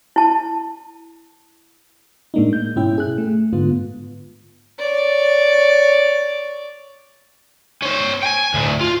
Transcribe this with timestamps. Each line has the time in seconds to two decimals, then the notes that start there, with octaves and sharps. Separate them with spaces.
0.16 E4 A5
2.34 A2 G#3 A#3 D4 D#4
2.53 G6
2.76 G#2 B2 C#4 E4 E5 G5
2.98 G#4 F#6
3.18 A3
3.53 G#2 D3 B3 F4
4.78 C#5 D5
7.82 C#4 C5
8.23 G5 G#5
8.54 D2 A2
8.81 F4